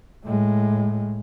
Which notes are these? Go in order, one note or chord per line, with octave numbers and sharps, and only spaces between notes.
A2 G#3